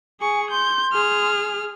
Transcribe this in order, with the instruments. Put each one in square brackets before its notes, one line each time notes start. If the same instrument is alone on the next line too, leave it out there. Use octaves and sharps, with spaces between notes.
[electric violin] G#4 C#6 [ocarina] G#5
[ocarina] C6 [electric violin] G6
[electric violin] G#4 F6